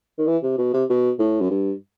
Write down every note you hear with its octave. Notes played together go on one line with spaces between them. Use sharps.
D#3
E3
C3
B2
C3
B2
A2
F#2
G2